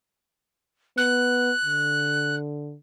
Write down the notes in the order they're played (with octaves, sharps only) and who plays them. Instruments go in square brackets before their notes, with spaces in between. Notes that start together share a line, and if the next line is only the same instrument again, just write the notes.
[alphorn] B3 [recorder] F#6
[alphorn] D3